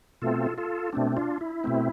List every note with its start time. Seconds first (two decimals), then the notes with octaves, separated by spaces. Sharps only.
0.22 B2 A3 C4 F4 A4
0.58 F4 A4
0.93 B2 A3 C4 D4
1.17 D4 F4
1.41 E4
1.64 B2 A3 C4